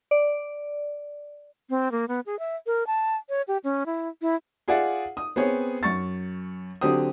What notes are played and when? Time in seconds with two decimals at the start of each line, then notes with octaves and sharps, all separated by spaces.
0.11 D5
1.70 C4
1.92 A#3
2.08 B3
2.26 G#4
2.39 E5
2.67 A#4
2.87 A5
3.29 C#5
3.48 G4
3.64 C#4
3.86 E4
4.22 E4
4.68 F4 G#4 D5 E5 F#5
5.17 D#6
5.36 B3 C4 G#4 C#5
5.83 F#2 C#6 A6
6.81 D3 F#3 C4 G4 D#6